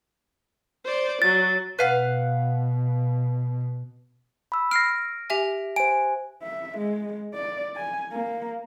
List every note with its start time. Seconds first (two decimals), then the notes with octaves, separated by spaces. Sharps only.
0.85 C5 D5
1.22 F#3 A6
1.79 B2 B4 F5 F#5
4.52 B5 E6
4.71 F6 A#6 C7 D7
5.30 G4 E5 G#5
5.76 C5 G#5 D7
6.43 E5
6.78 G#3
7.34 D5
7.76 G#5
8.12 A#3